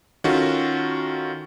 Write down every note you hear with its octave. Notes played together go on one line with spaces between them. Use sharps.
D#3 C#4 F4 F#4 A4